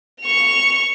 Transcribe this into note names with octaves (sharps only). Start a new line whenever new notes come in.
C#6 F7